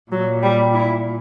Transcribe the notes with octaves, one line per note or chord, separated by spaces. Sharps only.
A#2 F#3
G3
E4